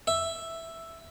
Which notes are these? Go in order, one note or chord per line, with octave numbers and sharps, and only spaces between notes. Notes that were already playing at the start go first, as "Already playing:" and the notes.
E5